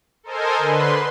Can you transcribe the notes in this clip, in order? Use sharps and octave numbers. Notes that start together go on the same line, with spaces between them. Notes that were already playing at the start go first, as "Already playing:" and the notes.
A4 A#4 C5 D#5 G#5
D3 B4 C6